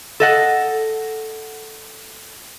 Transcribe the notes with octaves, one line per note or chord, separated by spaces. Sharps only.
A4 D#5 F#5